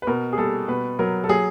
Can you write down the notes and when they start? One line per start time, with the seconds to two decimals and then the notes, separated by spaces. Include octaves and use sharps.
0.02 B4
0.07 B2 A#4
0.33 G#4
0.38 G3 A4
0.68 B2 B4
0.99 F#3 A#4
1.24 A4
1.29 F#3 G#4